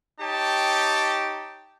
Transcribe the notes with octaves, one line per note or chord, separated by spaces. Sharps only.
D#4 G4 C#5 G5 A5